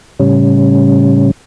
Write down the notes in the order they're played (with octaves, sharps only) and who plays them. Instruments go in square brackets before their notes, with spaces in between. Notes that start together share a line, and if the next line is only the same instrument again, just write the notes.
[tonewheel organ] A2 C#3 G3 C#4